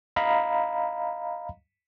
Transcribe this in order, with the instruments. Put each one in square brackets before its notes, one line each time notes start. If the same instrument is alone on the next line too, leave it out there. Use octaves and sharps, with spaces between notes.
[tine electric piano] D#5 F5 A#5 B5